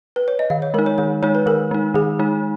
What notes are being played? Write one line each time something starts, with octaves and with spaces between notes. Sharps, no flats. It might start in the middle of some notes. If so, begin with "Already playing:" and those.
B4
C#5
D#5
D#3 F5
C#5
G#3 D#4 A#4
C#5
D#3 C#5
G#3 D#4 C#5
B4
D#3 A#4
G#3 D#4
D#3 G#4
G#3 D#4